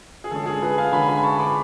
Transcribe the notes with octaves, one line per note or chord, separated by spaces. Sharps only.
G#4
D3 G#3 C#4 A4
G#4
G#4 B4
F5 G#5
D3 G#3 C#4 G#5 B5
G#5 B5
A5 C#6
B5 D6